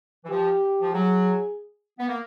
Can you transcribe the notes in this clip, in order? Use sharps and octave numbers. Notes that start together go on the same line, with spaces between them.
E3
F3 G4
F3
F#3 G#4
B3
A#3